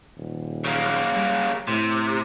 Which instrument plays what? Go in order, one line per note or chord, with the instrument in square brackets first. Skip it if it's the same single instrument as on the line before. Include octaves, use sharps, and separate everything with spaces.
[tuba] D#1
[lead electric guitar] C#3 A#3
[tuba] G3
[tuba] A2 [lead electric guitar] C3